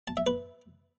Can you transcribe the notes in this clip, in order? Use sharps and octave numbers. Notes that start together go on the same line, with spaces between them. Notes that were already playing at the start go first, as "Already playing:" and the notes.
A5
E5
B4